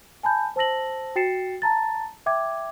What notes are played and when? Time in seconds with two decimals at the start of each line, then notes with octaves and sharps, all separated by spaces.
0.23 G#5 A5 B5 G6
0.56 C5 A5 E6 A#6 F#7
1.16 F#4 G5 A6 C7 C#7 E7
1.62 A5 A#5 A6
2.26 E5 G5 D6 G#6